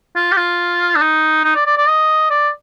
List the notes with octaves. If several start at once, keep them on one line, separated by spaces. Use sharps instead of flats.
F4
G4
F4
D4
D#4
D#4
D5
D5
D5
D#5
D5